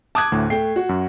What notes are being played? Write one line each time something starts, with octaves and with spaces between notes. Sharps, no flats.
A5 D6 D#6 F#6 G#6
D2 A2
A3 G5 C7
F#4
F#2